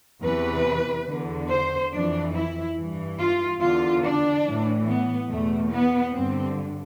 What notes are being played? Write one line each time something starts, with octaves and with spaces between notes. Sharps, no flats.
E2 C3 E3 B4
E2 D3
C5
F2 E3 D4
E4
G2 E3
F4
E2 D3 F4
D4
A2 E3
B3
E2 B2 A3
B3
G2 D3 C4